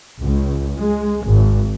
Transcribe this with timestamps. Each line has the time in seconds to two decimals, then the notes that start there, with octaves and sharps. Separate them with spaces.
0.22 C#2
0.78 G#3
1.27 G#1